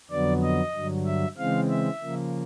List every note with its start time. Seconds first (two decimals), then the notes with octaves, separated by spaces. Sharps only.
0.11 F2 D3 F#3 B3 D5
0.42 D#5
0.74 G2 D3 F#3
1.06 E5
1.38 C#3 E3 G#3 C4 F5
1.70 E5
2.01 C#3 F3 A#3